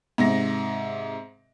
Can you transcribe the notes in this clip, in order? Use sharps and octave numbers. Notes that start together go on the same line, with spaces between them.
G#2 C3 A#6